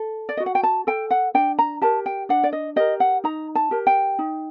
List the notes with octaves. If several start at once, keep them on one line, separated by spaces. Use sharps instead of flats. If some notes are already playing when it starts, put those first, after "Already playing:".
Already playing: A4
D5
F#4 D#5
F#5
G5
A5
A4 G5
F#5
D4 G5
A#5
G4 A#4 A5
G5
D4 F#5
D5
D#5
G4 A#4 D#5
F#5
D#4 A#5
A5
G4 A#4
G5
D#4